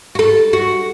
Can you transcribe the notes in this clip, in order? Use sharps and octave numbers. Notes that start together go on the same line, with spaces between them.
F#4
A4
F#4